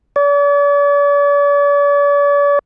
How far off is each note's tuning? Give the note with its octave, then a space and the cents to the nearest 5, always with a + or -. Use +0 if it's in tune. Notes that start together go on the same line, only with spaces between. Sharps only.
D5 -45